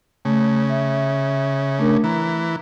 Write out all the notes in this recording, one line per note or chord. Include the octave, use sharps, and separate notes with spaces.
C#3 A3
E5
A3 D4 A#4
E3 A#5